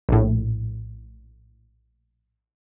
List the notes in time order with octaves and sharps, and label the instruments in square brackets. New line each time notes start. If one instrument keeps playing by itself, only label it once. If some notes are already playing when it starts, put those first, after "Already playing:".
[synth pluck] A#1 A2